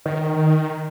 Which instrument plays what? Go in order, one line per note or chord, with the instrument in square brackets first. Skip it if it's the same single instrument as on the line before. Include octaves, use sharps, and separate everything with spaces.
[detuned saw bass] D#3